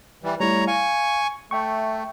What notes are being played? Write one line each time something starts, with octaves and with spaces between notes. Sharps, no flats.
E3 G3
G3 A3 E4 C#5 A#5
F5 G#5 C#6
A3 E5 G5 C#6